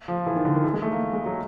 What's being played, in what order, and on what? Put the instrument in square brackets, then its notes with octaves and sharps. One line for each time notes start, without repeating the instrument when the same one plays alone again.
[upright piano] F3
E3
D#3
D3
D#3
E3
G#3
A3
A#3
G#3
F#3